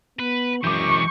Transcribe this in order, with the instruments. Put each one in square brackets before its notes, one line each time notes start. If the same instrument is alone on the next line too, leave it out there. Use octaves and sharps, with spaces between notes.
[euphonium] B3 [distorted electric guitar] B4
[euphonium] F#2 [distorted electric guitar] E3 G#3 [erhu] C#6 [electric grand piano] D6 G6